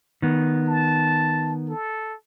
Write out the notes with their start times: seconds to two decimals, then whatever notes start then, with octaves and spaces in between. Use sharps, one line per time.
0.22 D#3 B3
0.68 A5
1.69 A4